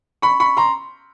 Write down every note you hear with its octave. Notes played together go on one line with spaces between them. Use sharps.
B5 C#6
B5 C#6
A#5 C6